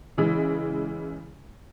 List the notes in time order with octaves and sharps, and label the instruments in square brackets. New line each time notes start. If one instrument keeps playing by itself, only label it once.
[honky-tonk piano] C#3 E3 G#3